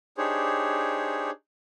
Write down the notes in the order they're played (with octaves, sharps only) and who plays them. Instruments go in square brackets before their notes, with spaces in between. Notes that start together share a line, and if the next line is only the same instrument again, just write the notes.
[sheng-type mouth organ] D4 D#4 G4 G#4 C5 C#5